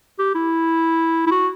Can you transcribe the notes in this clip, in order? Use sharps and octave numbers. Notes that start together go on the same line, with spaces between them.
G4
E4
E4
F#4